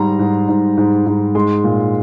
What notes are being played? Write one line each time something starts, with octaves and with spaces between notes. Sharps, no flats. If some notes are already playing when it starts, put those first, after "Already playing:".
Already playing: G#2 G3 A#5 C6
G#2
G#2
G#2
G#2
G#3 C6
A#2